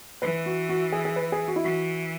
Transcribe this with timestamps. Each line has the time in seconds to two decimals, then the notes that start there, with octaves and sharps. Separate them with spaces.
0.22 E3 B4
0.46 F#4
0.69 F#4
0.92 G#4
1.05 G#4
1.16 B4
1.32 G#4
1.48 F#4
1.56 E4
1.64 E3 F#4